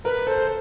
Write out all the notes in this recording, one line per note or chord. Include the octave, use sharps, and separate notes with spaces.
A#4 B4
A4 C5